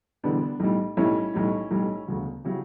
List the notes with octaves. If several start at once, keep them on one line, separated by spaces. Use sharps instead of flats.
E1 E2 D3 G3 B3 D4
B1 A2 G3
B1 A2 G3 C#4 E4
B1 A2 G3
B1 A2 G3
E1 D2 C#3 F#3
C#3 F#3 E4 G4